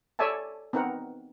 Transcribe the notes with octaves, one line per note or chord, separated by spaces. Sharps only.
A4 C#5 D5 E5 G#5 A5
B3 C4 D#4 A#4 F#5